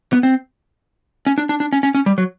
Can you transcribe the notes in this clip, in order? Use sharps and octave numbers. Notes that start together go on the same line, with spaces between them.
B3
C4
C#4
D4
D4
D4
C#4
C#4
C#4
G3
F#3